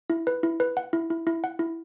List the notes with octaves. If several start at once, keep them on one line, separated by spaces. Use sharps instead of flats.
E4
B4
E4
B4
F#5
E4
E4
E4
F#5
E4